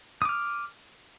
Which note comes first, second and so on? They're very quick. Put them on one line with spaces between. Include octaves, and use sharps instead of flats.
D#6 D6 F6